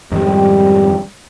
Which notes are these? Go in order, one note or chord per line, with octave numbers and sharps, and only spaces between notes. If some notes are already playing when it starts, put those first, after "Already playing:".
F2 G#2 D#3 G3